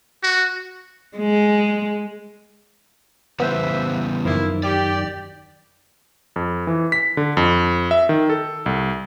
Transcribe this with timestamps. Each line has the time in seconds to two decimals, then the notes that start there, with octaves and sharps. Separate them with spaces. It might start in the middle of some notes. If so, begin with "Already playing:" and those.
0.23 F#4
1.17 G#3
3.40 C#3 E3 G3 B3 B4 C5 E5
4.25 F#2 D#3 F3 A#3 E4
4.63 G4 D5
6.36 F2
6.67 E3
6.92 B6
7.17 D3
7.37 F2
7.91 E5
8.09 D#3
8.30 A4
8.66 C2